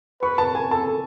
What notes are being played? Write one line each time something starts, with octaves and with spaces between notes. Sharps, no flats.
B4 C#6
A5
G#5
A4 A5